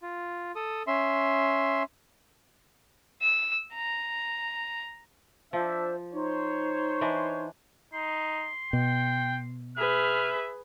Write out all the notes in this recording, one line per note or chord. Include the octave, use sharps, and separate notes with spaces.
F4
A4 D#6
C#4 E5 C6
E6
A#5
F3 D4 C5 E5
D#4 C5 C#5
E3 D4 D#5
D#4 C6
B2 G5
G#4 B4 E5 F6